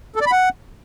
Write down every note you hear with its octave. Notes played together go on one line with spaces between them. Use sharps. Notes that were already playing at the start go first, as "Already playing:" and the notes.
A4
D5
B5
F#5